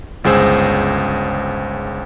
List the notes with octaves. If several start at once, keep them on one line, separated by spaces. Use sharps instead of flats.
G1 C#2 G#4 C5 E6